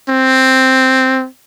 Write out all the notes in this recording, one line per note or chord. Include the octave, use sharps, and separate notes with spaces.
C4